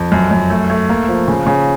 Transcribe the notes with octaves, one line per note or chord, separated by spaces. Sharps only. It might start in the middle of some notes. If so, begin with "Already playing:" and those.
Already playing: F2
F#2
F#2
A3
A3
A#3
F3
C#3
C#3